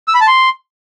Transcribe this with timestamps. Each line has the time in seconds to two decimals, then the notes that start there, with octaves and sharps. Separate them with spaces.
0.08 E6
0.14 B5
0.21 A5
0.27 C6